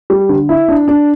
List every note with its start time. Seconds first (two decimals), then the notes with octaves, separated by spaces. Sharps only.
0.10 G3
0.29 D3
0.49 E4
0.68 D4
0.88 D4